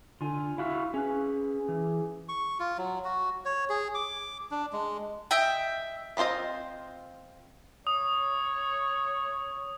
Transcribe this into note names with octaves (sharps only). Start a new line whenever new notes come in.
D3 F4 G#5
E4 F#4 E5 F5
C#4 G#4 B4
E3
C#6
F4
F#3
F#4
C#5
G#4
D6
D4
G#3
D#5 E5 G5
B3 C4 F4 C5 D#5
C#5 D#6